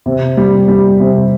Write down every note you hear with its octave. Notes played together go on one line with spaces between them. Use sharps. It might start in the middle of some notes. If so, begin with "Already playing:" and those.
C3
G3
G3
C3